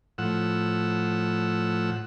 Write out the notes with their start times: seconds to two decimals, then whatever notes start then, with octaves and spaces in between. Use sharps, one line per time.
0.18 A2 F3 F#5 E6